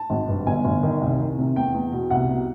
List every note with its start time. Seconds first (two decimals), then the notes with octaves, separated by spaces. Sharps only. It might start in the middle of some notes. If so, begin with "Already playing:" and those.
Already playing: A5
0.10 G#1
0.28 G2
0.47 G1 G#5
0.65 G1
0.83 D#3
1.01 C2
1.19 C2
1.38 C3
1.56 E2 G5
1.74 E2
1.92 B2
2.10 C2 F#5
2.29 B2